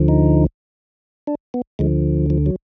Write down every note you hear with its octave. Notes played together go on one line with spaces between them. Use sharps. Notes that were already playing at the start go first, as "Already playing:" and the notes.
Already playing: D2 D3 F3
D#4
D4
B3
D2 D3 F3 G#3
F3
F#3